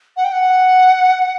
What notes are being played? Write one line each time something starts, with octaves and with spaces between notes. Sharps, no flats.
F#5
G5
F#5